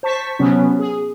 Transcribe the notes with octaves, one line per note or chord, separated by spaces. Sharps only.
C5 A5 C#6 B6
C3 F#3 B3 C#4
G#4